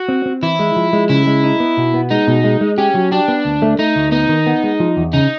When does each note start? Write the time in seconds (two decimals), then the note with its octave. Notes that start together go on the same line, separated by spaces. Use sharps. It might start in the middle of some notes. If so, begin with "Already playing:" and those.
Already playing: F#4
0.09 C4
0.26 C4
0.43 E3 E4
0.59 G#3
0.76 F3
0.93 G#3
1.09 C#3 E4
1.27 G#3
1.44 D#4
1.60 B3
1.77 B2
1.94 B3
2.11 G#3 D#4
2.27 B2
2.44 G#3
2.61 G#3
2.78 C#4 G4
2.95 F#3
3.12 D4 G4
3.28 B3
3.45 D2
3.62 A3
3.79 A3 D#4
3.96 D2
4.12 B3 D#4
4.29 D#3
4.47 B3
4.64 G#3
4.80 F3
4.97 E2
5.13 C#3 D#4